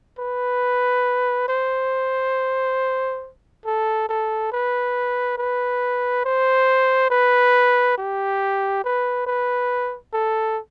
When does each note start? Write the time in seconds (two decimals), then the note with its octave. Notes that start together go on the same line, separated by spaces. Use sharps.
0.19 B4
1.49 C5
3.66 A4
4.09 A4
4.52 B4
5.38 B4
6.25 C5
7.10 B4
7.98 G4
8.84 B4
9.27 B4
10.14 A4